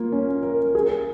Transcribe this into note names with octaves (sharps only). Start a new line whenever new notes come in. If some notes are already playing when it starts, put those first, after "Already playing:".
Already playing: A#3 F4
C#4
A#4
G#4